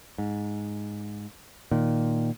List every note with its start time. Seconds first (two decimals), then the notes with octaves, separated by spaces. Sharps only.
0.18 G#2
1.71 A#2 D#3